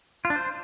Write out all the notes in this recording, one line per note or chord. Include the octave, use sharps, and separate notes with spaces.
F4
D4
C5